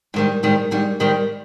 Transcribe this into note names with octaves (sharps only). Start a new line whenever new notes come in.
G#2 D#3 G3
G#2 D#3 G3
G#2 D#3 G3
G#2 D#3 G3